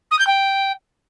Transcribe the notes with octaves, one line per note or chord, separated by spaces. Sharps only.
D#6
G6
G5